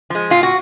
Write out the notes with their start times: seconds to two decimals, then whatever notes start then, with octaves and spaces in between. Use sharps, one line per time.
0.10 F3 G#3
0.30 A#2 F4
0.43 F#4